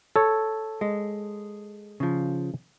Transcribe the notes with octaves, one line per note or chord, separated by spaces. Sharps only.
A4 C#5
G#3
C#3 F3